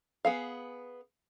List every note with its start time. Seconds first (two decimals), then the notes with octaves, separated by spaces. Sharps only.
0.25 B3 G#4 F5